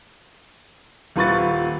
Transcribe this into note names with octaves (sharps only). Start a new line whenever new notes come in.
D#1 F4 B4 C#6 A6